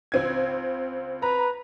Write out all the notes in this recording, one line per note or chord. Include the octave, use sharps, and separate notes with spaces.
C#2 C4 G#6
B4 A#5